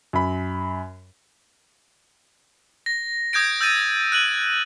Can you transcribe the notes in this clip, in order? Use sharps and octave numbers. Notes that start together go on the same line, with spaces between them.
F#2 B5
A#6
D#6 G6 G#6 A#6 D7
E6 G6 A6 D#7
F#6 D#7 F#7